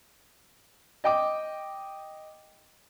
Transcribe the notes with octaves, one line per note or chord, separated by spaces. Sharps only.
D#5 G5 D6